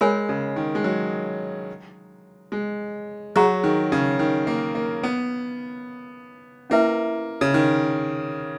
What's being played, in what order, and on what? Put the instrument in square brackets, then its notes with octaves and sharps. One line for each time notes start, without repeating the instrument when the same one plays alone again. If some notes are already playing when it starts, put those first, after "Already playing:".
[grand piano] G#3 [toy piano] A#4 C#5 G#5 B5
[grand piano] C#3
D#3
G#3
F#3
G#3
[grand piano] F#3 [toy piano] G#4 C#5 F#5 A#5 C#6
[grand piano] D#3
C#3
D#3
A#3
A#3
B3
[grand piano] A#3 [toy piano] C#4 E4 B4 E5
[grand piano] C#3
D#3